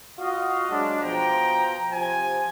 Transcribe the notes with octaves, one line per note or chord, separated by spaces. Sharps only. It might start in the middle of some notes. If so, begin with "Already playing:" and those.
F4 F#4 D#5 F5
F#3 G#3 D4
B2 F3 G5 A#5
C3 F3 G#5